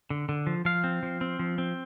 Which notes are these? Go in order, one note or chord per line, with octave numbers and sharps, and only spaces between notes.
D3
D3
F3
F3 F5
C4
F3
C4
F3
C4